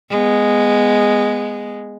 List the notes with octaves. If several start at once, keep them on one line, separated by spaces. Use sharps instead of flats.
G#3 B3